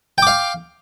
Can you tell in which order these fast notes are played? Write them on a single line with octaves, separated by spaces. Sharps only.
G5 D6 F5